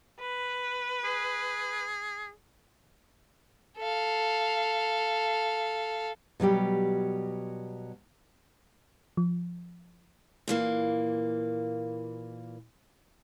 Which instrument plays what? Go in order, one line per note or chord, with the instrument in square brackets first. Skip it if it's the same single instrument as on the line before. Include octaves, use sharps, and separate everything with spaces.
[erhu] B4
[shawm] G#4
[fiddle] A4 F5
[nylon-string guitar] B2 F#3 G3 G4
[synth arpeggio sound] F3
[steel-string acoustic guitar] A#2 E3 A#3